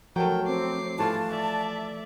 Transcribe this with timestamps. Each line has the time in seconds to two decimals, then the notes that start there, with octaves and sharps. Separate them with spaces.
0.16 F3 F#3 A3 A#4 G5
0.47 C4 D6 C7
0.98 E3 A3 F4 A5
1.30 D5 E5